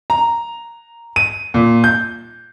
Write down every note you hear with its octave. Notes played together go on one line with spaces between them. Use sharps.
A#5
D#7
A#2
G6